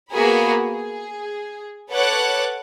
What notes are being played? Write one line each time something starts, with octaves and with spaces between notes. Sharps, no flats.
A#3 B3 F#4 G#4 A#4 B5
G#4
A4 B4 C#5 F#5 D6 F#6